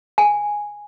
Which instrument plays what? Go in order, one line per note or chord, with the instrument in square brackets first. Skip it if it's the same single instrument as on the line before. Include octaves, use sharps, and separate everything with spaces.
[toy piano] G#5